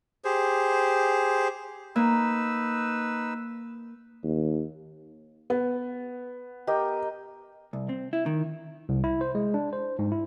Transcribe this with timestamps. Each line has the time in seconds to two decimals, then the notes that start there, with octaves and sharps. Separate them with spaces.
0.25 G4 G#4 C5
1.96 A#3 D#4 B4 E6
4.24 D#2
5.50 B3
6.67 G4 A#4 D#5
7.73 C2
7.89 C4
8.13 E4
8.26 D#3
8.89 C2
9.04 E4
9.21 C5
9.35 G#3
9.54 D4
9.73 C5
9.99 G#2
10.12 E4